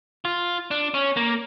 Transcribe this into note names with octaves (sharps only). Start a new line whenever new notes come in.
F4
D4
C#4
A#3